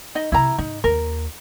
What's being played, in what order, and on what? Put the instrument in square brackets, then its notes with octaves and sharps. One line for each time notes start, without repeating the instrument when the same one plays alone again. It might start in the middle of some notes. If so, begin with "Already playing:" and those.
[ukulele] D#4 D#5
[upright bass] C3 C4 [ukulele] E4 A#5
[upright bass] G#2 [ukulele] D#4
[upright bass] D#2 [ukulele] A#4